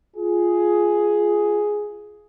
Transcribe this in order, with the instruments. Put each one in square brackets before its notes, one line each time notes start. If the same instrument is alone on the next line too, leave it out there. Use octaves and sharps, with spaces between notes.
[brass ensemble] F4 G#4